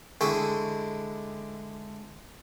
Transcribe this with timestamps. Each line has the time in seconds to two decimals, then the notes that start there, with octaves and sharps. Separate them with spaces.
0.21 D3 G#3 E4 G5 G#5 C#6